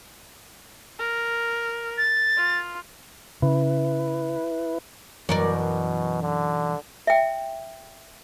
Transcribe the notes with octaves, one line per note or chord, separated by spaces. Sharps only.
A#4
A6
F4
C#3 E4 B4
B1 F#2 B2 E3 A#4 C#5 D5
D3
E5 G5